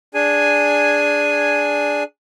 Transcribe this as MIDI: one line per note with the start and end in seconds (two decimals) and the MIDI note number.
0.14 2.03 62
0.14 2.03 68
0.14 2.03 80